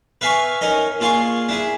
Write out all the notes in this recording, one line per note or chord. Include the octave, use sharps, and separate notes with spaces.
B4 E5 F5 G#5 B5 C#6
C#4 D#4 A#4 D#5
A#2 F4 G#4 F5 C6 C#6
D4 E4 G#4